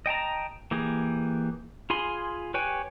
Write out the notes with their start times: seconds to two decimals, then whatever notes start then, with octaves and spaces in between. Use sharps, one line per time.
0.06 D#5 G5 A5 A#5
0.71 E3 A#3 G4 G#4
1.90 F4 G#4 G#5 B5 C6
2.54 G4 B4 C#5 G5 G#5